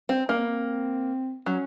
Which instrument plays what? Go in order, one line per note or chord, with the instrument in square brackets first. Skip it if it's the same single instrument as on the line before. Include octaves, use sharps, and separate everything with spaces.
[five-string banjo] C4
[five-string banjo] A#3 [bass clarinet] C#4
[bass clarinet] C4
B3
C4
[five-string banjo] F#3 [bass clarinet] C#4